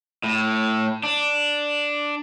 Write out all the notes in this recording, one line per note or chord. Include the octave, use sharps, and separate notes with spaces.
A2
D4